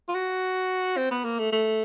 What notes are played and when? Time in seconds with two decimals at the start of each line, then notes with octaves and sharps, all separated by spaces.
0.09 F4
0.15 F#4
0.97 C4
1.11 B3
1.25 A#3
1.39 A3
1.52 A3